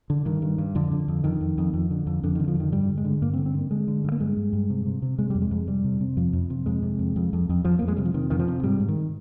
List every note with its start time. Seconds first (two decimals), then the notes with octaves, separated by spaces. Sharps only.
0.10 D3
0.25 G2 D#3
0.42 G2
0.58 G2
0.75 F2 D3
0.91 D3
1.08 F2
1.24 F2 D#3
1.41 F2
1.58 F2
1.73 F2
1.91 D3
2.07 F2
2.23 F2 D3
2.35 D#3
2.39 D3
2.48 F3
2.55 F2 D#3
2.72 G2 G3
2.88 D3
2.97 G#3
3.05 D3
3.22 G2 A#3
3.33 C4
3.38 D3
3.46 C4
3.54 D3 A#3
3.71 D3 G#3
3.88 D3
4.04 G2
4.12 A#3
4.20 G2 G#3
4.37 G2
4.53 G2
4.70 C3
4.86 C3
5.02 C3
5.18 C3 G#3
5.30 F2 G3
5.42 G#3
5.51 F2
5.67 C3 G3
5.84 C3
6.00 C3
6.17 F2 F3
6.33 F2
6.50 C3
6.66 F2 G#3
6.83 C3
6.99 F2
7.16 F2
7.33 F2
7.49 F2
7.65 F2 F3
7.79 F2 A#3
7.88 G#3
7.97 C3 G3
8.05 F3
8.14 C3 D#3
8.30 F2 D#3
8.39 F3
8.48 C3
8.63 G#2 G3
8.80 G#2
8.89 D#3